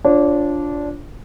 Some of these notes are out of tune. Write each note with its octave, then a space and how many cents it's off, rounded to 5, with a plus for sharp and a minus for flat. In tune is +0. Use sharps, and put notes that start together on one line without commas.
D4 -15 F4 +0 C#5 -35